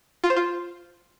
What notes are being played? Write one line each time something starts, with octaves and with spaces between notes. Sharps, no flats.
F4
C5
F4